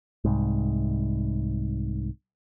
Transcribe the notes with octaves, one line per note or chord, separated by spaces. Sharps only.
C2 G#2